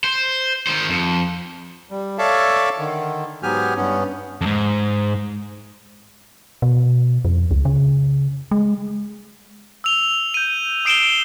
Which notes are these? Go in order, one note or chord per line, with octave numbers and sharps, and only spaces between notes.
C5
D#3 C5
F2
G3
A4 C#5 D5 E5 F5 A5
D3 D#3
G#2 F#3 B3 G4 G#5 F6
G2 B3 C#4
F2 G#2
B2
F2
C#2
C#3
G#3
E6 F7 G7
G6 D#7
D#6 C7 D7 E7 F7 G7